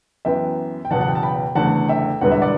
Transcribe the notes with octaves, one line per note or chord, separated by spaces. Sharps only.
F#2 E3 B3 E5 G5
G5
F#1 E2 B2 F#5 A5
F#5
G5
A5
G5 B5
F#1 E2 D3 A3 F#5 A5
E5 G5
E1 E2 D3 G3 B3 F#5
E5
D5 F#5